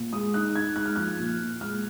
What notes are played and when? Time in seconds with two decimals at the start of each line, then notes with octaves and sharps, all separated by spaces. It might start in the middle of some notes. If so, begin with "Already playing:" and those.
Already playing: A#2
0.13 G#3 D#6
0.34 D#4 F#6
0.55 D#4 G#6
0.76 G#3 F#6
0.86 F6
0.96 F3 F#6
1.19 A#2
1.40 A#2
1.61 G#3 F6